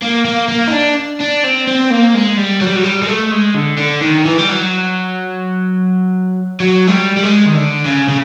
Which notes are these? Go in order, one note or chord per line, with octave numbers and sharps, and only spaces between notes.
A#3
A#3
A#3
D#4
D4
D4
C4
C4
A#3
G#3
G3
F#3
G3
F#3
G3
G#3
A3
G#3
D3
D3
D#3
E3
G3
F#3
F#3
G#3
G3
G3
G#3
D#3
D3
C#3
C#3